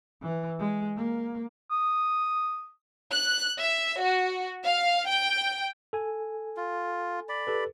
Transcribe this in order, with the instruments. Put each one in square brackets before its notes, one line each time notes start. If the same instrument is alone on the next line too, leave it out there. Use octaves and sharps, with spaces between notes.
[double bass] E3
G#3
A#3
[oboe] D#6
[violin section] F#6
E5
F#4
F5
G5
[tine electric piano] A4 G#5
[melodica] F4
D5 B5
[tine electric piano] G4 A4 B4